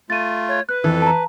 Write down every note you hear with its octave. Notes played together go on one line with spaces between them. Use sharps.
A3 F4 A6 D#7
C#5
B4 F#6
F2 E3 A4
A5 A#5